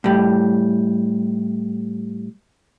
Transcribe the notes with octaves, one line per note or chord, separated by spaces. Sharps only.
A2 G3